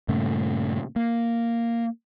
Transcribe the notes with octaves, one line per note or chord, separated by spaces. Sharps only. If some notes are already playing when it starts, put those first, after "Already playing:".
G2 A#2 C#3 A3
A#3